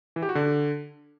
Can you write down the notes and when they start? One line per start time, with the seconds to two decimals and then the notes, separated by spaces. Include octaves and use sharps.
0.16 E3
0.22 G4
0.29 F#4
0.35 D3